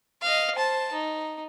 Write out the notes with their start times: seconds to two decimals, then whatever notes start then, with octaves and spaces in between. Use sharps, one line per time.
0.22 D#5 F5
0.55 C5 A5
0.93 D#4